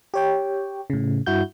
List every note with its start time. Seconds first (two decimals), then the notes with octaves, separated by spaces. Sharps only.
0.14 G4 C#5 G5
0.90 A2 C#3
1.26 G2 E4 F#4 G6